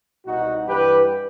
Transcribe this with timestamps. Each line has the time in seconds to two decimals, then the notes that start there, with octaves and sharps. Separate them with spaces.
0.25 C2 B2 G3 D#4 F#4
0.66 G2 E3 G3 G4 B4